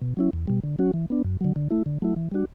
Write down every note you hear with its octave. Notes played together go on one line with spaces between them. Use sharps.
B2
F#3 C#4 E4
E2
B2 G3
D3
F#3 C#4 F#4
E3
B3 D4
F#2
D3 F#3
D3
A3 E4
D3
F#3 A3 E4
E3
G3 D4 F#4